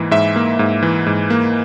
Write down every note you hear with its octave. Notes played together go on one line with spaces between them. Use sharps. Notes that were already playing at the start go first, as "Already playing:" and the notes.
Already playing: G#2 E3 A#3
G#2 E5
A#3
G#2
E3
G#2
A#3